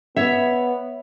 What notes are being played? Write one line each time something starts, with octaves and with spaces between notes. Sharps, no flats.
B3 C#5 E5